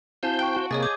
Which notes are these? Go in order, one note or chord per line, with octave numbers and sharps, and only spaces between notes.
C4 E4 F#4 C5 F5 G#5 A5 G6
G5 C#6 F#6 D7
F#4
C3 A#3 G#4 C#5 D#5 A6
D6 D#6 G6 G#6